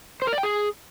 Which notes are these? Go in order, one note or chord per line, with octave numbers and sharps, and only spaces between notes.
C5
A#4
D5
G5
G#4